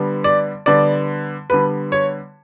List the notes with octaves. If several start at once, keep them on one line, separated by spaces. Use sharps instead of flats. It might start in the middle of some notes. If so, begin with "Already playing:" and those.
Already playing: D3 G3 B3
D5
D3 G3 B3 D5
D3 G3 B3 B4
C#5